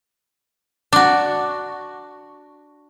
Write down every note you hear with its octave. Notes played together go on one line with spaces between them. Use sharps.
D4 F#4